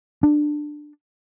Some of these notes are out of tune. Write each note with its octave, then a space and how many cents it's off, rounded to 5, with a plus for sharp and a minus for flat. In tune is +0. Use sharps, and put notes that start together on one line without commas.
D4 +15